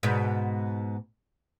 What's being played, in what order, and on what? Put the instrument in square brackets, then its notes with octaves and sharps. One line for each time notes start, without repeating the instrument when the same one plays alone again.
[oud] G#2 B2